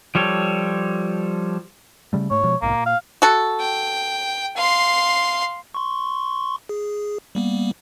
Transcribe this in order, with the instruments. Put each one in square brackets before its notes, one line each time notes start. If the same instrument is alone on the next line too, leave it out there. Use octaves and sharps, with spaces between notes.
[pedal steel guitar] F3 G3 A4 C#5
[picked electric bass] C#3 G3 A3
[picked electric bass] G#2 A3 [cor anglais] C#5
[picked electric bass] B2 F3 G#3
[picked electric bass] A#1 G#2 B2 [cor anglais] A#3
[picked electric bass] A#2
[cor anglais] F5
[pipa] F#4 A4
[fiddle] G5
F5 C6
[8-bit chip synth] C6 C#6
G#4
G3 A#3 B3